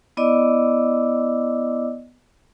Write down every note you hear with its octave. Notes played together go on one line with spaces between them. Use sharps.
B3 E4 D5 D#5 D6 E6